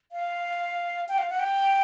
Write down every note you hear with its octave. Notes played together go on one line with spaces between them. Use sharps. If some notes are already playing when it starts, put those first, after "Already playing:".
F5
G5
F5
F#5
G5